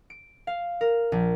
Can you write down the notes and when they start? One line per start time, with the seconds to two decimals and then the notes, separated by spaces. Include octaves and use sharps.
0.10 D7
0.47 F5
0.81 A#4
1.12 A#1